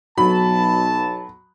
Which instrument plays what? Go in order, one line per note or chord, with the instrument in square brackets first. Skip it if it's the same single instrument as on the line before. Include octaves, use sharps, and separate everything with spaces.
[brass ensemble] B1 A5 [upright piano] F#3 [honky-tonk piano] B5